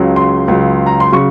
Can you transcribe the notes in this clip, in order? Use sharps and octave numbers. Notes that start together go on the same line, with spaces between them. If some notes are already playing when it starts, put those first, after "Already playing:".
Already playing: C#2 C#3 F#3
C6
C#2 C#3 F#3
A#5
C6
C#3 F#3 C#6